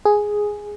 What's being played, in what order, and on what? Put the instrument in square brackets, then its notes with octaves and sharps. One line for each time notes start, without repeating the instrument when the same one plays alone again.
[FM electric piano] G#4